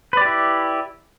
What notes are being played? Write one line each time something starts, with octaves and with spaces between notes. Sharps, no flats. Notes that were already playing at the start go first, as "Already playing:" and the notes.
E4 G4 B4 D5